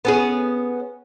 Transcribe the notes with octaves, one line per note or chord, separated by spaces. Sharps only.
B3 C#4 G#4